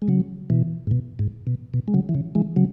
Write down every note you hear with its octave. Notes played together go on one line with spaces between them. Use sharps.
G#3
C#3 F#3
B2 E3
G#2
B2
G#2
B2
B2
G#3
C#3 F#3
E3
C#3
E3 G#3
C#3 F#3